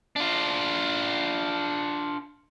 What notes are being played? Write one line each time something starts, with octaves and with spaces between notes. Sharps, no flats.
D4 F4